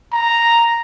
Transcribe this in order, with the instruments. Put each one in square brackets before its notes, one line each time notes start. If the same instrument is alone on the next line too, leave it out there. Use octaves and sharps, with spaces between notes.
[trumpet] A#5